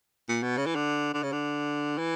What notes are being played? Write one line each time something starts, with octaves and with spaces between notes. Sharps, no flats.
A#2
B2
C#3
E3
D3
D3
C#3
D3
E3